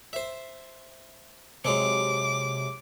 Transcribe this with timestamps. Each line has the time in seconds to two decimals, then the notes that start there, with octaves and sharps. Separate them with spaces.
0.13 C5 E5
1.65 C3 F#3 G#3 C4 D6